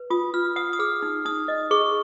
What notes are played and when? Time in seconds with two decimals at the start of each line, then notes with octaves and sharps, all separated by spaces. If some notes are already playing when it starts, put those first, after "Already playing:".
Already playing: B4
0.10 F4 D#6
0.34 F4 F6
0.56 F#5 D#6
0.73 D#6
0.79 G#4 F6
1.03 D#4
1.25 D#4 D#6
1.48 D#5
1.71 G#4 C#6